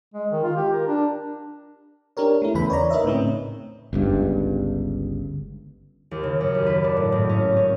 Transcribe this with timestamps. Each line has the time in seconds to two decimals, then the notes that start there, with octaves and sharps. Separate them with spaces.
0.14 G#3
0.31 D#3
0.43 F4
0.56 G4
0.73 A#4
0.87 D4
2.17 D4 G4 A#4 C#5
2.42 A3 E4
2.54 E2 C#3 B4 B5
2.70 C#5 D5 A#5
2.90 D#4 A#4 B4 D#5 E5
3.04 A2 C#3 C4 C#4
3.93 G1 C#2 G2
6.11 D#2
6.23 C#3
6.41 F#2
6.55 D#2
6.66 B4
6.84 D4
6.97 A2
7.12 G#1
7.29 C#4
7.56 C#4